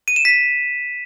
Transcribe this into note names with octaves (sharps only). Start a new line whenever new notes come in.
D#7
E7
B6